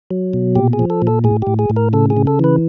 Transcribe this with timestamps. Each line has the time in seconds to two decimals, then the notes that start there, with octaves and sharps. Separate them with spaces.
0.11 F#3
0.33 B2
0.55 A#2 G4
0.73 G#4
0.79 F3
0.90 A4
1.02 A#2
1.07 A4
1.24 A2 G#4
1.42 A2 G4
1.59 G#4
1.70 A2
1.76 A#4
1.93 C#3 A4
2.10 G#4
2.17 C#3
2.27 A4
2.39 E3 B4